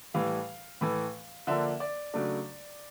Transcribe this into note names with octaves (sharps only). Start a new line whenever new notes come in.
A2 E3 G3 F5
A2 E3 A3
D3 F3 A#3 D4 E5
D5
C#3 F#3 A3 D4